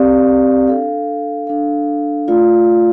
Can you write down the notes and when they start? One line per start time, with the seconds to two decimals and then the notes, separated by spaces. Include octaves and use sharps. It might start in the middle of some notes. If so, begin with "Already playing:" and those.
Already playing: C4 G4 D5 F5
0.67 D4 A4 F5
1.47 D4 A4 F5
2.28 A3 F4 D5 F5